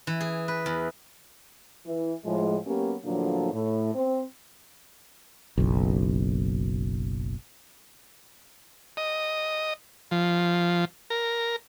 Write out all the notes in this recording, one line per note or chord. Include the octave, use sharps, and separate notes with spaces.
E3
G#4
B4
E2
E3
A2 F3 G#3
F#3 A#3 B3 C#4 G4
A2 D3 F3 F#3 A#3 D4
A2
C4
F#1 B1
D#5
F3
A#4